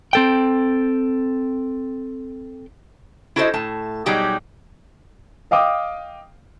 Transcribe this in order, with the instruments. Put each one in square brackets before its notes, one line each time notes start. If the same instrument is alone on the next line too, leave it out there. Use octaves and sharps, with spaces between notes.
[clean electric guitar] C4 A4 G5
[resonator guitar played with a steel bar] E4 F#4 A4 A#4 C5 D#5
A2 A5
B2 F#3 G3 D#4 G4 G#4
[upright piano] D#5 F5 G5 D6 D#6